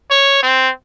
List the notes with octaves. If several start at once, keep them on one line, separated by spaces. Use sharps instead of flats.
C#5
C4